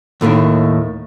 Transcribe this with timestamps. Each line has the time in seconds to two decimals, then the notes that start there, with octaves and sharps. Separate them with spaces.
0.21 D#2 A2 D3 D#3